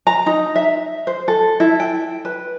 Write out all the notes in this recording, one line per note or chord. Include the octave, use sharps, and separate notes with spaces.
A#5
D#4
E5
C5
A4
E4
G5
B4